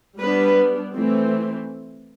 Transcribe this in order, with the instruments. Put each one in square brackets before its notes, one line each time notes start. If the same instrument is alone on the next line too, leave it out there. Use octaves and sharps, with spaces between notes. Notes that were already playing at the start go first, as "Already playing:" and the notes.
[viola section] G3 B3 D4 B4
E3 A3 C4